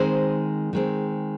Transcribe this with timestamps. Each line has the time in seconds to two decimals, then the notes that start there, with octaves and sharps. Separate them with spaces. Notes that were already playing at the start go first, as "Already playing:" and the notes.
Already playing: D#3 G#3 C4 C5
0.73 D#3 G#3 C4